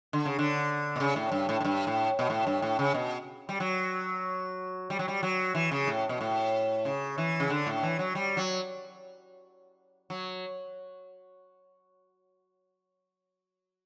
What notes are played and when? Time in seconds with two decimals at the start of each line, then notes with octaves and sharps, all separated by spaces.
0.13 D3
0.25 C#3
0.39 D3
0.96 B2
1.00 C#3
1.16 A2
1.32 G2
1.49 A2
1.60 A2
1.65 G2
1.87 A2
2.19 B2
2.30 A2
2.47 G2
2.62 A2
2.79 C#3
2.94 B2
3.49 G3
3.60 F#3
4.90 G3
4.99 F#3
5.08 G3
5.23 F#3
5.55 E3
5.72 C#3
5.87 A2
6.09 B2
6.21 A2
6.85 C#3
7.18 E3
7.40 C#3
7.50 D3
7.67 A2
7.83 E3
7.99 F#3
8.15 G3
8.37 F#3
10.10 F#3